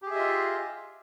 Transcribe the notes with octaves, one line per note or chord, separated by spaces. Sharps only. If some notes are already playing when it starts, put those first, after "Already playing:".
F4 G4 G#4 D#5 E5